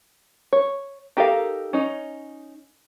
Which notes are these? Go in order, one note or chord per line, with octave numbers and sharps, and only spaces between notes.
C#5
D#4 G4 A4 A#4 F5
C#4 D#4